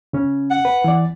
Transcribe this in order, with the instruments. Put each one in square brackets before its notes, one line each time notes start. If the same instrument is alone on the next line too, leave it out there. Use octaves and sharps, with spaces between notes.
[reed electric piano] C#3 C#4
[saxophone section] F#5
[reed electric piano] B4
E3 D5